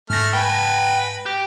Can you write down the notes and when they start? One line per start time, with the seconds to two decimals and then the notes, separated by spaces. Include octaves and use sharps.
0.10 G#2 A3 F6 A#6
0.33 B4 G5 G#5
1.26 G4